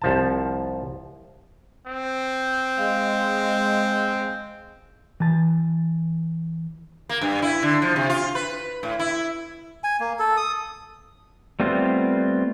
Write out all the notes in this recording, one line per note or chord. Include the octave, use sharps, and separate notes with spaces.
C2 F3 A5
C4
G#3 F5
E3 A5
A#3
G2
E4
D3
F3
C3
F4
B4
A2
E4
G#5
A#3
A4
D#6
G3 A3 B3 C4 F4